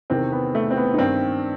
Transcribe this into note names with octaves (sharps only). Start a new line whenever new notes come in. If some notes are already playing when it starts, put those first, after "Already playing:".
E2 C3 D#3 C4
B3
A3
C4
B3
D#4
G2 D#3 C4